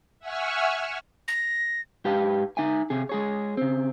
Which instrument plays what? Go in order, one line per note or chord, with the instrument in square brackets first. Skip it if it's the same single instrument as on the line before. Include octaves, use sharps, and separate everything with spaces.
[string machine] E5 F#5 G#5 C#6 E6 F6
[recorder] A#6
[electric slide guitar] G#2 G4 B4 F5 A5
D#4 E5 G#5
C3 G#4
G#3 G#4 C#5
C#3 C4